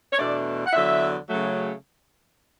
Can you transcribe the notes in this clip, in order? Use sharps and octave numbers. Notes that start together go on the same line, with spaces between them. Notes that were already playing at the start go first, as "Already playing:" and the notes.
C#5
E2 B2 A3 D4 D5
F#5
E2 D3 F#3 E5
C#3 F#3 A3